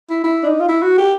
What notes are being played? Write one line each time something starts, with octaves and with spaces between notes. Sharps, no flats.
E4
E4
D4
D#4
F4
E4
F#4
G4